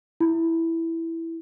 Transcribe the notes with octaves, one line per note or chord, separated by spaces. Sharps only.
E4